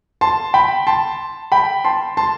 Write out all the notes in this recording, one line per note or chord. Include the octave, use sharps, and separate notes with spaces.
A5 C6
G5 B5
A5 C6
G5 B5
A5 C6
A5 C6